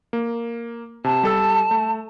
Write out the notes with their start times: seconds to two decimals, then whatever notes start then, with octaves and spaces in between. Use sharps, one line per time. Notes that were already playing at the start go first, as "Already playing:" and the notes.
0.13 A#3
1.04 C3 A5
1.23 G3 A4 E6
1.71 A3